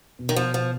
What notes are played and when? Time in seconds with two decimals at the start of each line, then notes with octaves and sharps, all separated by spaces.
0.19 B2
0.29 D#3
0.36 B2 F3
0.54 B2 F3